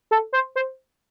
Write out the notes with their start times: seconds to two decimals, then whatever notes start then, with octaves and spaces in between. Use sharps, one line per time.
0.11 A4
0.33 C5
0.56 C5